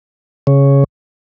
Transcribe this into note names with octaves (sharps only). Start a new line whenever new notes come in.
C#3